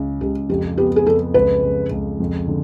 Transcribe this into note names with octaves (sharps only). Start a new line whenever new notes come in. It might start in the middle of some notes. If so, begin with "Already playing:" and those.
Already playing: C#2 C#3
C#2 G4
F2 G4
B3 G4
G#4
F2 A4
C#2 B4
C#2
C#2
F2
D3